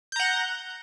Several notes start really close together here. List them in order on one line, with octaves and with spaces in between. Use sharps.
G6 A#5 F#5